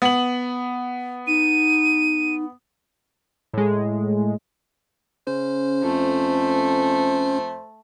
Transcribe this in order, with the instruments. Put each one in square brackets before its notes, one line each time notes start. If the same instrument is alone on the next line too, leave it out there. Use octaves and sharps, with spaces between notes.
[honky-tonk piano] B3 F#7
[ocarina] D#4 [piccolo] D#7
[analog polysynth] A2 G#3
[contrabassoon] C#3 [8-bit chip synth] C#4 [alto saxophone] C5
[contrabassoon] F2 [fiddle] A3